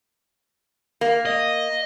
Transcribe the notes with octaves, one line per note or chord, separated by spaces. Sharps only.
A#3
D#5